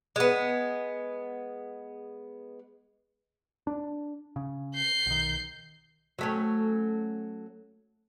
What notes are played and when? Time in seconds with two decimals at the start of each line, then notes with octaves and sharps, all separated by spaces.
0.16 G#3 B3
3.67 D4
4.36 C#3
4.75 G6 C7
5.06 B1 D#3
6.19 F#3 A3 C#4